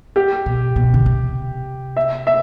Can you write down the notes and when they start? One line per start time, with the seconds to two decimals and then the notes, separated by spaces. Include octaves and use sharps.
0.16 G4
0.46 B2
0.76 B2
0.94 D3
1.06 C3
1.97 E5
2.27 E5